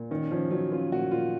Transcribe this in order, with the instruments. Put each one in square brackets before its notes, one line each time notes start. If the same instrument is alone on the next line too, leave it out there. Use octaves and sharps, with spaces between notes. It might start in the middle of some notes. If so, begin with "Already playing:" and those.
Already playing: [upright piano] A#2
[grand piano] D#3 [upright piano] C#4
[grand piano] F3 [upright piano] C#4
[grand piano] F#3 [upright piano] C#4
[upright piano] C#4 [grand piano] F4
[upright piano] A#2 [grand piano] F#4
[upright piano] A#2 [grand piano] F4